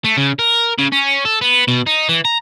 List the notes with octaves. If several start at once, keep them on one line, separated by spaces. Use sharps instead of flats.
A3
C#3
A#4
C#3
C#4
A4
B3
B2
D#4
E3
A#5